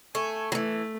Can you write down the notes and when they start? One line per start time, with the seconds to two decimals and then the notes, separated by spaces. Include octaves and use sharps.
0.15 A3 G#5
0.52 E3 F#3 A3